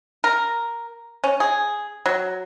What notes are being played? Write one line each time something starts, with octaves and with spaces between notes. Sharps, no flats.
A#4
C#4
G#4
F#3